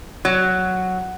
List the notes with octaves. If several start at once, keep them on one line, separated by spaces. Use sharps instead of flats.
F#3